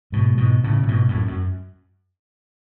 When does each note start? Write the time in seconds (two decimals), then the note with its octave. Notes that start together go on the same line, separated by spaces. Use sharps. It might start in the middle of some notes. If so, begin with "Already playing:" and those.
0.12 G#2 B2
0.37 G#2 B2
0.64 A2 C#3
0.83 A2
0.88 G#2 B2
1.08 F#2 A2
1.27 F#2